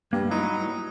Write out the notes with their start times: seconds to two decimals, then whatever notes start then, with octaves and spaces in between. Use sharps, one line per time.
0.13 G2 A#3
0.31 F#3 G3 D#4 E4